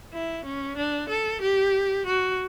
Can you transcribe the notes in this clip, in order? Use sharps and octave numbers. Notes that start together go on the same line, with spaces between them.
E4
C#4
D4
A4
G4
F#4